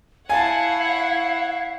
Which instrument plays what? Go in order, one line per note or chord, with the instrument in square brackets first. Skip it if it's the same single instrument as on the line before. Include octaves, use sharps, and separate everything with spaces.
[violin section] E4 C#5 F#5 [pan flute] F5 [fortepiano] G#5 A5